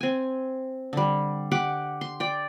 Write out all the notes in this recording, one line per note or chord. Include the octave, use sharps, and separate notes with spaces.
C4 G#5
D3 G3
G4 F#5 D6
C6
D5 G5